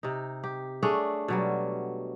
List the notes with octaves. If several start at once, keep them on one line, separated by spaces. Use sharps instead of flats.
C3 D#4
G4
A3 D4 G#4 C#5
B2 F#3 G3